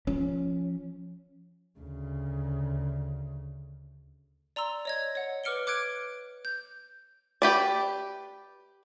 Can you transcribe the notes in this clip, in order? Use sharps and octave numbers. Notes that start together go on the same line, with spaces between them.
F3 C#4
D2 C#3
D5 A#5 C6 E6
C#5 D#5 G#6
C#5 F#5
B4 D6 F6 C#7 D7 G7
D6 F#6 G#6 D7
G6
G4 B4 D5